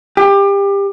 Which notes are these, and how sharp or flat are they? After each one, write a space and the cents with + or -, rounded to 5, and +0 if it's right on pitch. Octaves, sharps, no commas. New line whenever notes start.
G4 +25